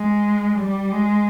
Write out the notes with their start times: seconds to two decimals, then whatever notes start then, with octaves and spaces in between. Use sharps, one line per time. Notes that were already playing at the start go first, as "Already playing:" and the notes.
Already playing: G#3
0.58 G3
0.91 G#3